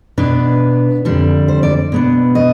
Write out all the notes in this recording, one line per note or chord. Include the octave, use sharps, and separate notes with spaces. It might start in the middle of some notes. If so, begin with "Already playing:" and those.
B2 B3 D4 B4
F2 D3 G3 D4
C5
D5
B2 B3 D4
D#5